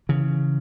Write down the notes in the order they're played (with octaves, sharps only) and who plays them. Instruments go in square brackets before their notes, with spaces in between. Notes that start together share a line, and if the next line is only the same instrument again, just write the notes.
[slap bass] C#3 E3